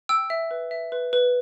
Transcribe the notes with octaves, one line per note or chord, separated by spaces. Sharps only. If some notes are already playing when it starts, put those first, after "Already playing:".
G5 E6
E5
B4
E5
B4
B4